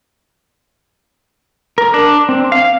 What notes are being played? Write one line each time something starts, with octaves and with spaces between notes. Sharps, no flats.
A#4
D4
C4
F5